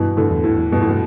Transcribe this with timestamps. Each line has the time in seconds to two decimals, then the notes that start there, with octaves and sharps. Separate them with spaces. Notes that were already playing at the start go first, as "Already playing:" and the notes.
Already playing: G2 B2 E3
0.17 A2 D3
0.30 E2
0.44 A2
0.58 E2
0.72 G2 B2
0.82 A2
0.90 B2